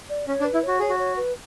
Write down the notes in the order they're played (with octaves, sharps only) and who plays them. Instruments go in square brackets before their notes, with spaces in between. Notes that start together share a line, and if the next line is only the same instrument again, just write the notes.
[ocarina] D5
[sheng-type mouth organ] C#4 [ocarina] C#5
[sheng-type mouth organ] D4
[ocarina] B4
[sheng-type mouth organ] E4
[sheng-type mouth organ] F#4 [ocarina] C#5
[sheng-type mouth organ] G#4 [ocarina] C#5
[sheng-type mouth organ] F#4
[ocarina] C#5
B4